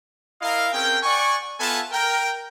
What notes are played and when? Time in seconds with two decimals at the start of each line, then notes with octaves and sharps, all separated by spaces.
0.41 E4 A#4 D#5 F5
0.73 C4 C#4 G#4 A#4 G5
1.03 D5 F#5 G#5 C#6
1.60 B3 F4 A4 E5 G#5 A5
1.92 A#4 G5